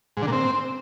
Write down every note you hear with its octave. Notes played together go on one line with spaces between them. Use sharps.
G#2
D3
A#2
C4